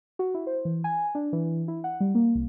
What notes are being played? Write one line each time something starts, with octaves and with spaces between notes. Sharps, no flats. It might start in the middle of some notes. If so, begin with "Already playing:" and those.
F#4
E4
C5
E3
G#5
D4
E3
E4
F#5
G3
A#3
C2